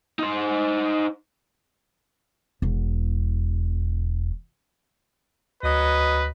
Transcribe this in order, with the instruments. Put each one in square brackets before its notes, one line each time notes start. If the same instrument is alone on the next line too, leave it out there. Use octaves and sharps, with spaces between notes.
[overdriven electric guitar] D#4 C5
[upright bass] E1 E2
[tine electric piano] D2 [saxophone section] F#3 D#5 [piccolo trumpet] B4